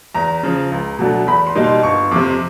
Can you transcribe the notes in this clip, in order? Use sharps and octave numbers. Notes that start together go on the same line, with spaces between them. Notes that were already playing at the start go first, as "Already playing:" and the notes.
E2 A#5
C#3 F3
C#2
B2 F#3 A3 D4
E2 B5
C6
B2 G3 A#3 D#4
C6
G1 C#6
F2 C3 D6